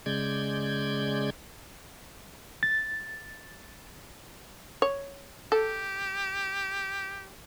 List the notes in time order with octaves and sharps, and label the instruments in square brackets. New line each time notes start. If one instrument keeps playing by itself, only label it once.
[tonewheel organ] C#3 G#3 D5 G6 G#6
[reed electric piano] A6
[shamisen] C#5
[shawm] G4 [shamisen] A4